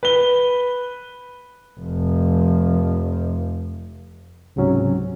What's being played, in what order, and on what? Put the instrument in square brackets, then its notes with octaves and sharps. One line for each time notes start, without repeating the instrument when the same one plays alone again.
[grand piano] B4 G7
[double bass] F1 F3
[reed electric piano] C#2 G#2 C3 F#3 C#4